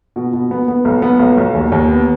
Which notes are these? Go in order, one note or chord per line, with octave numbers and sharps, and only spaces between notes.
B2
B2
B3
B3
B1
B3
B1
B1
D#2
D#2
B3